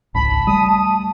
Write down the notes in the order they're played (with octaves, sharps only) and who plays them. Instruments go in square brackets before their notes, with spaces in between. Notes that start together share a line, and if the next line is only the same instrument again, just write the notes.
[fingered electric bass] G#1 C#2 [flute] A5 [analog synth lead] B5
[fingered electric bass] G3 A3 [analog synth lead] D#6